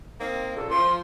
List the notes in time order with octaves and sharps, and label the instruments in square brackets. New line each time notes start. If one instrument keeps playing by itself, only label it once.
[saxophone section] A#3 C4 D#4 [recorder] F5
[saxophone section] F#2 A#2 C#3 [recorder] A4
[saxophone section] F3 [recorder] C6